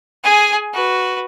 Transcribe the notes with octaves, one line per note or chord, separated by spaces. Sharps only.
G#4 G#5
F#4 B4